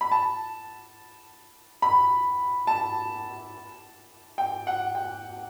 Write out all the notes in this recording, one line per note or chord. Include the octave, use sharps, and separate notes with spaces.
B5
A5
B5
A5
G5
F#5
G5